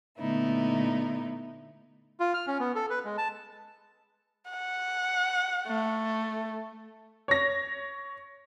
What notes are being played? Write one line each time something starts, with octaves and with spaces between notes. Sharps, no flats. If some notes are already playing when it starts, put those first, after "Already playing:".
A#2 D3 A3 B3 D#4 E4
F4
F6
C#4
B3
A4
B4
G#3
A5
F#5
A3
C#5 A#6